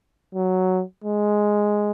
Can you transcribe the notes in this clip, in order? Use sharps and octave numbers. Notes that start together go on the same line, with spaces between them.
F#3
G#3